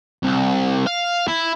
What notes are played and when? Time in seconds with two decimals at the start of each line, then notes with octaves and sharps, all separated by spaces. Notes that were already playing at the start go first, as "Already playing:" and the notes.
0.23 C2
0.87 F5
1.28 E4